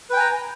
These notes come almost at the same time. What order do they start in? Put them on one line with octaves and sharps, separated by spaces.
B4 G5 G#5 A#5